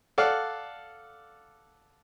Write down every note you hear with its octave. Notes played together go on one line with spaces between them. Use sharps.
A4 D5 F5 F#5